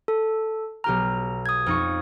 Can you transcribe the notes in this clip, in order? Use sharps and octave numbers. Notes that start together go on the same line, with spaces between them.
A4
B1 G4 A#5 F6
D#6 G#6
F2 D#4 C#6